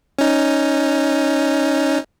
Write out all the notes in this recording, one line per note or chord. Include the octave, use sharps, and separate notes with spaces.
C#4 D#4